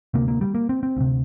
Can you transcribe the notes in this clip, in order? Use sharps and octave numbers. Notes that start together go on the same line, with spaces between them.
D2 C3 A#3
A#3
G3
A#3
C4
C4
D2 C3